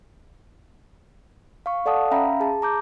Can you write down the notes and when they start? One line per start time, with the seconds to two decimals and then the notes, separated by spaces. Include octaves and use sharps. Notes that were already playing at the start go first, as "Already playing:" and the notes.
1.66 F5 C#6
1.86 A4 D5 F5 F#5 A5 D#6
2.11 C#4 E5 F5 G5 A#5 B5
2.40 G#4 A5
2.62 A#5 D6 G6